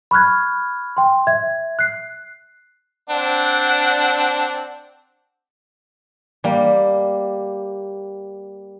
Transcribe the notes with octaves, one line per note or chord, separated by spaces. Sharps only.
B5 C#6 F6 F#6 G#6
G5 C6
E5 G#6
F#6 C7
C4 D4 F#5
G3 A#3